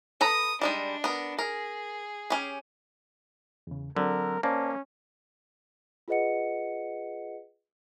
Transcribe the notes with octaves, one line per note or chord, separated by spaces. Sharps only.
A4 B4 A#5 D#6
G3 G#3 D4 D#4
B3 A#4
G#4 A#4
C#4 G4
E2 C#3
D3 F#3 C4 A#4
A#3 C#4 C5 D5 A5
F4 G#4 B4 D#5 F#5 C#7